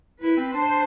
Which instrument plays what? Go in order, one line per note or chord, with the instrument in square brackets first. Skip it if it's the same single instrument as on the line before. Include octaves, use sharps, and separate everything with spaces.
[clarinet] E4 [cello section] B4
[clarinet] C4
[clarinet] D4 [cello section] C5